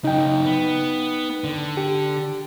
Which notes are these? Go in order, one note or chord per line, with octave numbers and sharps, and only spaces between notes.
C#3 F#3 D#4 G5
B3
D3
G4